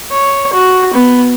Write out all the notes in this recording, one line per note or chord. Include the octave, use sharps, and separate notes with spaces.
C#5
F#4
B3